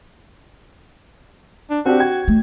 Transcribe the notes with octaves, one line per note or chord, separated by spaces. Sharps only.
D4
C4 D4 F#4 G4
G5 G#6
A3